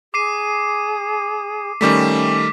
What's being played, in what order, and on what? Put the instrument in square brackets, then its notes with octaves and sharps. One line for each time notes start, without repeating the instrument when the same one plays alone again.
[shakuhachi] G#4 [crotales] D6 C7 D#7
[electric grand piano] D#3 G3 A3 [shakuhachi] C#4 [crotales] D6 B6